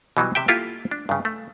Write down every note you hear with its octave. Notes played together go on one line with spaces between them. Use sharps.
B2 E3 F#3 G3
C3 E5 G5
A#3 E4 F4 G4 A4 A#4
D4
G2 C#3
A3